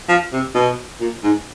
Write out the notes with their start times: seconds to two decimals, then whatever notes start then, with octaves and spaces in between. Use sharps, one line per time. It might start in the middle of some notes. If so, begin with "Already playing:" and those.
0.09 F3
0.33 C3
0.54 B2
1.00 A#2
1.24 G#2